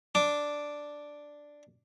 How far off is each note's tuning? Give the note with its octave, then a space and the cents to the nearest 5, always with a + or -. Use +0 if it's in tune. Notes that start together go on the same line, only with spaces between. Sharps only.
D4 +0 D6 +0